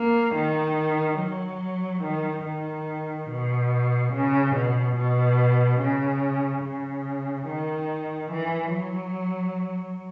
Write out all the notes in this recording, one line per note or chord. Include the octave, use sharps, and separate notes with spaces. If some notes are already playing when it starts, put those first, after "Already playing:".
Already playing: A#3
D#3
F#3
D#3
D#3
B2
C#3
B2
B2
C#3
C#3
D#3
E3
F#3